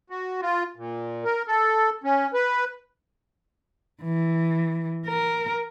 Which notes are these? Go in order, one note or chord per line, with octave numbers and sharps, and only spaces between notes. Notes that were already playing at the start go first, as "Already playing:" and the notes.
F#4
F4
A#2
A#4
A4
C#4
B4
E3
A#4